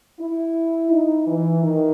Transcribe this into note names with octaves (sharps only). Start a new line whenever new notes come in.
E4
D#4
E3
D#3